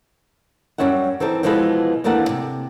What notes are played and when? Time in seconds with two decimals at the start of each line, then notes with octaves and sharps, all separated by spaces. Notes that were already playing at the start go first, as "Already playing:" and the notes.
0.78 F#2 G3 G#3 C#4 E5 F#5
1.20 E3 C4 D#4 A4
1.43 B2 E3 F3 G#3 A4 B4
2.04 D#2 E3 A3 A#3 D4 F#5
2.29 C3